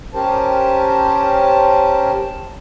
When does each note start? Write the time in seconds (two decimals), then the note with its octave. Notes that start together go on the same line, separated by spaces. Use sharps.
0.14 C#4 G4 A#4 C5 A5